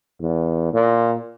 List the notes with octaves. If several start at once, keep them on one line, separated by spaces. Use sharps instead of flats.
E2
A#2